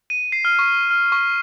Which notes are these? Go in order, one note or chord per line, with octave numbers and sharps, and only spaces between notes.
D#7
C7
F6
C#6
F6
C#6